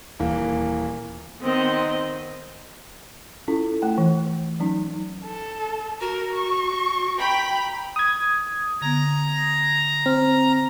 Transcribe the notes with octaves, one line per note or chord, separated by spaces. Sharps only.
D#1 E3 A#3
D#3 B3 C4 D#5
C#4 E4 F4 A4
A3 G5
E3
F#3 C#4 D#4
A4
F#4 A#4
C#6
G5 A#5 B5
D#6 G#6
D3 B3 A#5
C4 F6